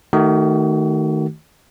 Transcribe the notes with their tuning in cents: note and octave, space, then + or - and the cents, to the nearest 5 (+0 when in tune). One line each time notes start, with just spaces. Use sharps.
D#3 +0 A3 +5 F#4 +35